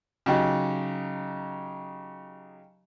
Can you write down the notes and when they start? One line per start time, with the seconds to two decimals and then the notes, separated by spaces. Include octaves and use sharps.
0.26 C#3 F#3 D#4 G4